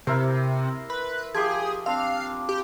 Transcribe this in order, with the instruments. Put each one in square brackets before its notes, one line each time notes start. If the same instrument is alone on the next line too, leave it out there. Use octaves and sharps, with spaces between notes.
[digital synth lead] C3 [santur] E4 A#4 C5
[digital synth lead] B4
[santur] F3 G4 C6 [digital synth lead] G#4
[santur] C4 D4 [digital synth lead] F5
[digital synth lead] G4